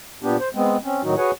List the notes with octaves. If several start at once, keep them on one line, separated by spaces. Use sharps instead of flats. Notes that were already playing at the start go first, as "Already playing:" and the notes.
A#2 B3 D4 G4
C5
G#3 B3 C4
C4 C#4
A2 D#3 F#3 D#4 F#4
F#4 G#4 B4 C#5 F#5 G#5